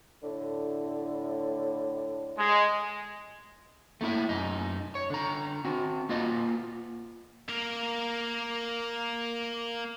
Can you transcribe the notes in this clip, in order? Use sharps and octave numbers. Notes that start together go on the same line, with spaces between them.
A2 D3
G#3
A3 A#3 E4 E5
F#2 D#4
C#5
D3 A#5
C4 F#4
A#3 F4 D#5
A#3 A#4